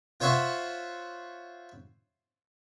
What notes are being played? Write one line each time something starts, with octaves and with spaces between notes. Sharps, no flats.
F4 C5 C#5 E5 F#5